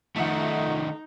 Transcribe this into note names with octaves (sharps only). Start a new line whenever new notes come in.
D#3 F3 A3 D#4 E5 F#5